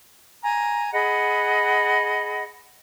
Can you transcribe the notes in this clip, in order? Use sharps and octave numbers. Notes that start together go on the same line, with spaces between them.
G#5 A#5
G#4 D#5 F#5 B5